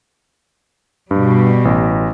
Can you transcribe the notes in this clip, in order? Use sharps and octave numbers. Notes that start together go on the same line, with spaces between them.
G2 B2 G3
A1